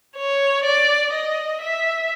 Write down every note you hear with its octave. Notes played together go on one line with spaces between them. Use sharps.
C#5
D5
D#5
E5